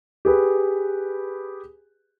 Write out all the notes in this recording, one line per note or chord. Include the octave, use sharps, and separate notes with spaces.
G4 G#4 B4